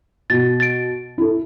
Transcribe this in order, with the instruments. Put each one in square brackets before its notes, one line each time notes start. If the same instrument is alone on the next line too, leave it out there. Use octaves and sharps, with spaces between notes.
[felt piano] B2 [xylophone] A6
[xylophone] A6 D7
[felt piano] E4 A4